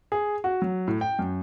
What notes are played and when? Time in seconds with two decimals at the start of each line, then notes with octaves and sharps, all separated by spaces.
0.12 G#4
0.44 F#4
0.62 F#3
0.88 A2
1.01 G5
1.19 F#2